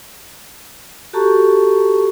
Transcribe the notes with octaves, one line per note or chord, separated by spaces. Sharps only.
F#4 G4 A4 A5 A#5 C#6